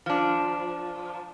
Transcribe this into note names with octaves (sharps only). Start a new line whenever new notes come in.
F3 D4